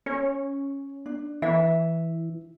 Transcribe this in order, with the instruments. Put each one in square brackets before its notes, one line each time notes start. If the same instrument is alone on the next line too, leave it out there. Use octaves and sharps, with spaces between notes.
[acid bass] C#4 [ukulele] C#5
[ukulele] D4
[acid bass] E3 [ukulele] E5